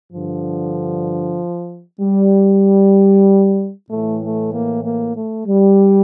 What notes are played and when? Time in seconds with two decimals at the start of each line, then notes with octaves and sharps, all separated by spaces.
0.11 G2 D3 F3
2.00 G3
3.89 A2 E3 A3
4.21 A3
4.52 A#3
4.83 A#3
5.15 A3
5.46 G3